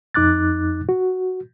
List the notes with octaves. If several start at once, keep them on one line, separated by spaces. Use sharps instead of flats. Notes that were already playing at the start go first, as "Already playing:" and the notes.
F2 D#4 D6 F#6 A6
F#4